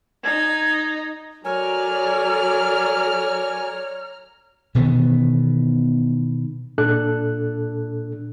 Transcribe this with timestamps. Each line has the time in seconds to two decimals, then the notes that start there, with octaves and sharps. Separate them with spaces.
0.24 D#4 G#6
1.45 F#3 A4 A#4 C#5 D5 G#5 A#5 F6
4.75 B2 D#3 E3 B3
6.78 A#2 D4 A4 F#6